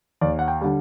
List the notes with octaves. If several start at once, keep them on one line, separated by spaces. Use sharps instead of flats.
D#2 D5
F#5
G5
D3 G3